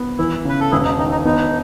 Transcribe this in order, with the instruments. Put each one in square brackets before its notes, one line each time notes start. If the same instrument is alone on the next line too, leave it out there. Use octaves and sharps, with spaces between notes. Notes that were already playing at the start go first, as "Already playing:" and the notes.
Already playing: [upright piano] B3
[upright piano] E3 [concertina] E4
[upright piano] C#3 [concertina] B4
[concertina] A4
[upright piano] E1 [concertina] E4 G#4
[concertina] D#4
[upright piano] D#3 [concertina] D#4
[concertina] D#4
[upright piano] B3 [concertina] D#4